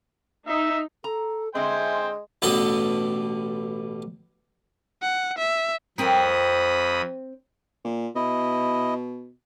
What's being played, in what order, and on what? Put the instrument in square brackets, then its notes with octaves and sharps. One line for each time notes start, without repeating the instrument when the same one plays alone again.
[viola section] D#4 [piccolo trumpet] E5
[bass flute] A4 [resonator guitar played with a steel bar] A#5
[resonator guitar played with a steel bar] D3 C4 [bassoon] G#3 [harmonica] C5 G5 G#5 [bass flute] E5
[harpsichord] A1 B2 D4 A4 D#6
[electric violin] F#5
E5
[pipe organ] F2 B5 D#6 [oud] C4 A#4
[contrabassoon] A#2
[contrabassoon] B2 [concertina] E4 D#5